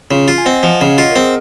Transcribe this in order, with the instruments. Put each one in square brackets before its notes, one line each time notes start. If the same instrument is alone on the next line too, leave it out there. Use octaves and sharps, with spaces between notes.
[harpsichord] C#3 [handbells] F4
[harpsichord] F4
[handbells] G#5
[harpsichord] C4 [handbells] D#5 F#5
[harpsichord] F3 [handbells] D#5 F#5
[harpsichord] C#3 [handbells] C#5 F5
[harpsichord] F4 [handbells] D#5 F#5
[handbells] A#4
[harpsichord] C4 [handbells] G#4